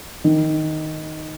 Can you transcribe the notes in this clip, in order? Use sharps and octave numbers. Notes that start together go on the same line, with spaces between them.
D#3